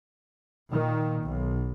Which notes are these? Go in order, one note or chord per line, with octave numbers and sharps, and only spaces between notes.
A#2 D#3
B1